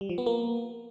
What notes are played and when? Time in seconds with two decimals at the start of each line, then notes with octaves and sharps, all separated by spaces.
0.01 G3
0.09 F3
0.18 B3
0.26 A#3